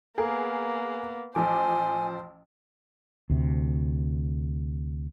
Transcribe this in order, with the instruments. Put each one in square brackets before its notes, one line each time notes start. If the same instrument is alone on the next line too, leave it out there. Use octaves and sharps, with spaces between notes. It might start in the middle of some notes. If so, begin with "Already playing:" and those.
[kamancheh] A#3 B3 [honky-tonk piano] G#4 A#4
[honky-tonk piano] A1 F3 D6 [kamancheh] C5 [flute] G#5
[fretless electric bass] D2 C3